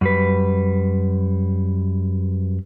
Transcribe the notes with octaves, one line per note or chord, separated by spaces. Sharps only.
F#2 G3 B4